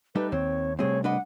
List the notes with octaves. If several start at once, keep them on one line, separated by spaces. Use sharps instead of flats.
G3 A3 D#4 B4
D#2 C4 C#5
C3 G3 A3 C4 G#4 C#5
D4 B4 D#5 F#5